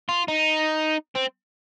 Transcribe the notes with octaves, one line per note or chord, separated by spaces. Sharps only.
F4
D#4
C4